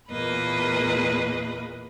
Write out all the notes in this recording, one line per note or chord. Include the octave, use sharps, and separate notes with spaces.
E2 A#2 A#3 B4 D#5 B5